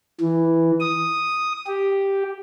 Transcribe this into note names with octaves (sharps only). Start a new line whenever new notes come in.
E3
D#6
G4